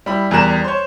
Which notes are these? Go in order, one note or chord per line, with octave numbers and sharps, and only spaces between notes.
G3 E4 B5
E2 G3 A#4 A#5 F#6 E7
C5 C#5